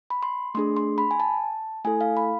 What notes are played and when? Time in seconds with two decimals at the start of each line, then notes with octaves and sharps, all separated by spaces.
0.10 B5
0.23 C6
0.55 A3 D4 G#4 C6
0.77 C6
0.98 B5
1.11 G#5
1.20 A5
1.84 A3 E4 A4 G#5
2.01 F5
2.17 B5